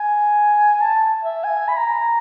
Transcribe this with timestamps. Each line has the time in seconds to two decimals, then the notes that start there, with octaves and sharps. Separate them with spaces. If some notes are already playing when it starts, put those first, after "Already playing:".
Already playing: G#5
0.81 A5
1.23 E5
1.44 G#5
1.68 B5
1.77 A#5